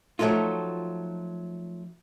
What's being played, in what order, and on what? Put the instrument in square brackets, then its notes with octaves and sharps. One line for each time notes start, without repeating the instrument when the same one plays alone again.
[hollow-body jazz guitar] F3 F#3 A3 D#4 F4